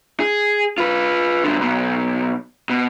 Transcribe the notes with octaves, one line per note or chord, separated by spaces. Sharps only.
G#4
F4 B4
F#2 D3
B1 B2
B2